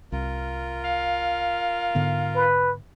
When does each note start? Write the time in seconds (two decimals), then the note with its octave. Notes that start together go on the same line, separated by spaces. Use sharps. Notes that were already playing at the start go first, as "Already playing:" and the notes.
0.12 C2 F4 A#4
0.84 F5
1.95 G#2 D3 B3
2.35 B4